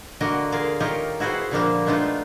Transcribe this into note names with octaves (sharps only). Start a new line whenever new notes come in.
D3 A#3 F#4 A#4 D#5
F4 G#4 A#4 F5
D#3 F4 G4 A#4 C#5 D#5
E4 F#4 G#4 B4 C5
A#2 D3 F3 G3 A#3 D4
G#3 A3 B3 D4 D#4 F4